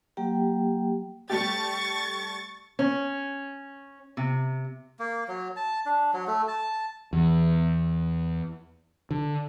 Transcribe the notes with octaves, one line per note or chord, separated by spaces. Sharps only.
F#3 A#3 G4 G5
G3 A3 G4 C#6 A6
C#4
C3
A#3
F#3
A5
D4
F#3
A3
A5
E2
D3